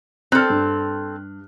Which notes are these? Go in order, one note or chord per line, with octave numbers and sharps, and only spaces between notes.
C4 A4 F6 F#6
G2